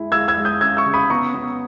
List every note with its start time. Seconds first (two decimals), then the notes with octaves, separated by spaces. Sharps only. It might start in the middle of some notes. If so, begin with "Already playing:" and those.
Already playing: G#3 E4
0.12 G#3 E6 G#6
0.28 E6 G#6
0.37 G#3
0.45 D#6 G6
0.61 C#4 E6 G#6
0.77 C#6 E6
0.86 C#3
0.94 B5 D#6
1.10 B3 A#5 C#6
1.34 B3